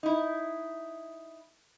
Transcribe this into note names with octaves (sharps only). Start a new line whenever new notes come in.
D#4 E4